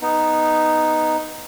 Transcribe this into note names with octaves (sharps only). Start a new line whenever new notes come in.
B3 D#4